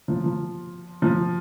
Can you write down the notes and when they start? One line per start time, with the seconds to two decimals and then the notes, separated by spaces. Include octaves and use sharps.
0.08 F3
0.24 F3
1.02 F3